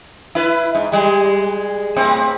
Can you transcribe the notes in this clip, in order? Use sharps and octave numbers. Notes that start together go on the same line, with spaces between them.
E4 B4
G#2
G3 G#3
A2 C4